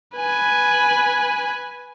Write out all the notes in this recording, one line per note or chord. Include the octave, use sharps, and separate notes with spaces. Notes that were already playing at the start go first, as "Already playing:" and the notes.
B4 G#5